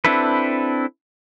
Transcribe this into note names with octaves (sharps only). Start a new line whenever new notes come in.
C4 D4 E4 A4 B4